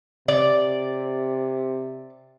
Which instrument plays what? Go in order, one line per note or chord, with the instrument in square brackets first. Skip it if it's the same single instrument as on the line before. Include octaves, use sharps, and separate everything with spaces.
[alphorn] C3 [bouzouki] D5